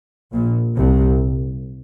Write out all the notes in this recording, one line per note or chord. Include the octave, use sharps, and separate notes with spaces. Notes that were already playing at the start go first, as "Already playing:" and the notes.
A#1 A#2
C2 C3